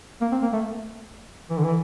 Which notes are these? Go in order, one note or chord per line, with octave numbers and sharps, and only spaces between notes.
A#3
C4
A#3
A3
E3
D3
E3